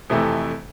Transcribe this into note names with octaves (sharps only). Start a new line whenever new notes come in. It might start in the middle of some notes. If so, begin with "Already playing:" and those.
F2 C3 E3 A3